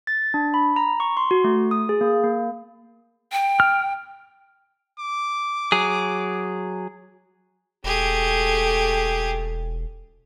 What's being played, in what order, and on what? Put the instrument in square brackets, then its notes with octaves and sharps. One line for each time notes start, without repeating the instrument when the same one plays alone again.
[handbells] A6
D4
B5
A#5
C#6
C6
F#4
A3
D#6
G#4
A#3
A#3
[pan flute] G5
[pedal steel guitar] F6
[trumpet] D6
[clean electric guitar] F#3 G#4
[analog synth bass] E1 [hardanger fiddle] A3 [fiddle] G4 G#4